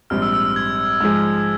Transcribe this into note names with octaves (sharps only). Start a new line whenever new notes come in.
A#1 G#2 G3 C4 F6
E6
E6
F6
G#6
G#2 F3 G#3